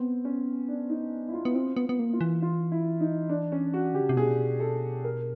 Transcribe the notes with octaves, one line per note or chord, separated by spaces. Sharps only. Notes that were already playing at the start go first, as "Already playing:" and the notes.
Already playing: B3 C4
C#4
D4
D#4
E4
F4
B3
C4 F4
B3
B3
A#3
F4
E3
F4
E4
D#4
D4
C#4
F#4
D3 G4
C#3
C3
B2 G#4
A4
A#4